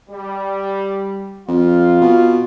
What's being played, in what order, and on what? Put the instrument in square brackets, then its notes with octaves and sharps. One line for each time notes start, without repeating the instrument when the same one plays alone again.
[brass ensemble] G3
[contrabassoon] F2 [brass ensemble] F4
[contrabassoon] B2